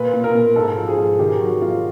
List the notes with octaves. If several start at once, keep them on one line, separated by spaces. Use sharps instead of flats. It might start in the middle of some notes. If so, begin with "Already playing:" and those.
Already playing: A#2 B4
A#2
A#4
A#2
G#2 A4
F3
G#4
G#2
D#3 G4
F#3 F#4
F#3 F4